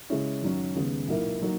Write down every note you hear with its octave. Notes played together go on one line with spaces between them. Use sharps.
C#3 G#3 C#4 E4
F#2 D#3 F#3 C#4
D#2 C#3 G#3 B3
B1 A#2 A#3 E4 A#4
F#3 A#3 D#4